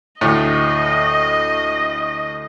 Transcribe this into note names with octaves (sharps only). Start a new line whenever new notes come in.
D2 A2 D#5